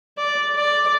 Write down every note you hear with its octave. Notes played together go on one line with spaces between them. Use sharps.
D5
D5